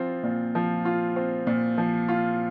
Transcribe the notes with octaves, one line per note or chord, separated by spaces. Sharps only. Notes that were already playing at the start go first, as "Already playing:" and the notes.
Already playing: F3 C4 F4
A#2
F3
F4
C4
A#2
F3
F4